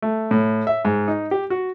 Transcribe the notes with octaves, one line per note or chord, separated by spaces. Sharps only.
A3
A2
E5
G#2
D#4
G4
F#4